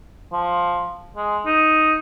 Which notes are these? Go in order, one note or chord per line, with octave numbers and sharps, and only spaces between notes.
F3
G#3
D#4